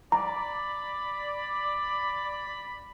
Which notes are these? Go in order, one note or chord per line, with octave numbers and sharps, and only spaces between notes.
D5 A#5 B5